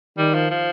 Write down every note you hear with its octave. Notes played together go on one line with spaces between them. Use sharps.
D#3 G3
F3
F3